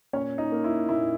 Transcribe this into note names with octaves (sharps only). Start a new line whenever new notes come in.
A#2 C#4 C#5
D#4
A#3
E4
A#2 E4